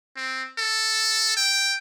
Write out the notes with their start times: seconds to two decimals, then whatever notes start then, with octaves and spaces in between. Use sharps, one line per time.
0.17 C4
0.59 A4
1.37 G5